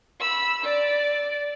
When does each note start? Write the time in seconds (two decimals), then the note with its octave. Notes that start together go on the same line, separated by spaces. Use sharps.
0.20 B5 E6
0.63 D5